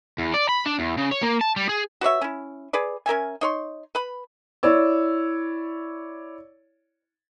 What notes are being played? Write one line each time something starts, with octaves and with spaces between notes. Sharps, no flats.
E2
D5
B5
D4
E2
C#3
C#5
A#3
A5
G3
G#4
F#4 B4 C#5 E5
C#4 E4
G#4 B4 D5
C#4 A#4 E5 G#5
D#4 C#5 C6
B4 B5
E4 C#5 D5 E6